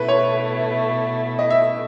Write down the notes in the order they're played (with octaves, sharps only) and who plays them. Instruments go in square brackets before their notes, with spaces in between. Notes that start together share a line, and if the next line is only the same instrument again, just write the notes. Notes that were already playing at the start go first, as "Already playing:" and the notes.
Already playing: [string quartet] B2 A3 E4 [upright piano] B4
[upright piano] C#5
D#5
E5